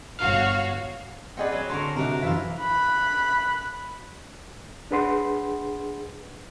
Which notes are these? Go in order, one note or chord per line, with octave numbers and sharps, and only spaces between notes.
G1 F#4 C#5 F5
C4 G#4 B4 D5 D#5 F#5
F#3 C#5
D3 F#3 A#4 A5 C6 C#6
C3 D4 D#4 F#4 A#4 E5
F#2 E3 E4 F4 E5 F5
B5 F#6
D4 G#4 B4 F#5 C6